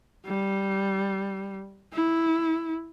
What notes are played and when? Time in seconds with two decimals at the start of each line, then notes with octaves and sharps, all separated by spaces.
0.26 G3
1.93 E4